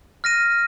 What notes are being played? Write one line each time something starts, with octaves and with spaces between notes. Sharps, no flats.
F6 A#6 D#7